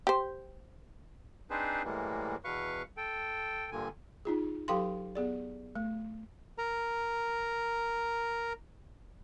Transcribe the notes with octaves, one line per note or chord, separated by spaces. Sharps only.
G4 C5
C4 D4 D#4 G#4 B4 C5
A2 E3 G3 G#3 A#3
E2 B2 B4 F5 C#6
A4 G5
G2 A#2 D3 G#5
D#4 F4 G#4
F#3 G4 A4 F5 G5 C6
B3 G#4 D5
A3
A#4 A#5